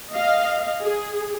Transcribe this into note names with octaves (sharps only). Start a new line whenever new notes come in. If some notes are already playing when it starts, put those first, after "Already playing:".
D#5 F5
G#4